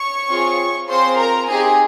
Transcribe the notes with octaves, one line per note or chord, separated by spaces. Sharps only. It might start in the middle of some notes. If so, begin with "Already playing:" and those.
Already playing: C#5 C#6
C4 F4 G#4
C4 F4 G#4 C5 C6
A#4 A#5
C4 D#4 G4 G#4 G#5